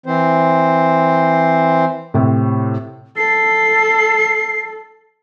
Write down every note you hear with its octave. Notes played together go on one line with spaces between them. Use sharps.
E3 C4 C5
A2 C3
A4 C7